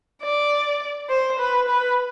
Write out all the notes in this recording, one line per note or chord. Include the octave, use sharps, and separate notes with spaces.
D5
C5
B4
B4